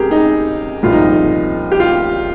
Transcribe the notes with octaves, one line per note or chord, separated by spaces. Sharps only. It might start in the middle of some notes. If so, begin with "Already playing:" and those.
Already playing: C#2 C3 G4 G#4 A#4
D#4
C2 A#2 F3 F4
D#4
D#4
G4
F4